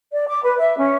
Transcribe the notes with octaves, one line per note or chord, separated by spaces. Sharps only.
D5
D6
B4
E5
C#4